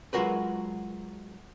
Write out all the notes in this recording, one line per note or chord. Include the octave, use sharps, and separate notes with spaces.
F#3 G#3 F4 F#4 A#4 B4